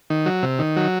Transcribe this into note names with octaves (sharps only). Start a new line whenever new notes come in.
D#3
F#3
C3
D#3
F#3